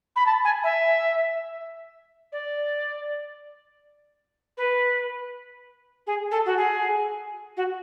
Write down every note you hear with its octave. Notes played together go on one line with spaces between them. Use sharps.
B5
A5
G#5
E5
D5
B4
G#4
A4
F#4
G#4
F#4